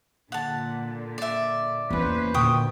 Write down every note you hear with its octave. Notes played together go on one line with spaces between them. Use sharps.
A#2 D3 F#5 A5
D5 E5
E2 A#3 C#4 B4 C5
D2 A#2 G5 C#6 D#6